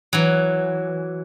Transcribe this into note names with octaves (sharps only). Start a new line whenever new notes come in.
E3 F#3